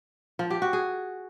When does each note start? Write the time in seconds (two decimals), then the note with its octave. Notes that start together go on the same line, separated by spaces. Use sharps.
0.39 F3
0.50 G4
0.62 F#4
0.73 G#4